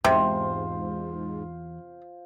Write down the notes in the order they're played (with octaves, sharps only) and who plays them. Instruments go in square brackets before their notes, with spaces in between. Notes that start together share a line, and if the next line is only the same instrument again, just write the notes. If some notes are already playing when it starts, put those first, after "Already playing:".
[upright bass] E2 [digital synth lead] G#2 [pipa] C3 [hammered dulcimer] F4 C5